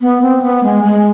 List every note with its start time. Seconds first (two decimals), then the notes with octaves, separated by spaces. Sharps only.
0.01 B3
0.22 C4
0.42 B3
0.63 G#3
0.84 G#3